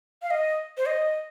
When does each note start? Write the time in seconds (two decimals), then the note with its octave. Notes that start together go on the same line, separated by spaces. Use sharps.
0.22 F5
0.31 D#5
0.77 C5
0.86 D#5